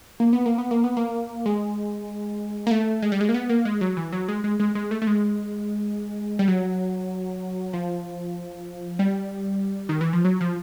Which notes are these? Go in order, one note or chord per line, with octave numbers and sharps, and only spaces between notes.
A#3
B3
A#3
B3
A#3
B3
A#3
G#3
A#3
A3
G#3
G3
G#3
A#3
B3
A#3
G#3
F#3
E3
F#3
G#3
G#3
G#3
G#3
A3
A3
G#3
G3
F#3
F3
G3
D#3
E3
F3
F#3
F3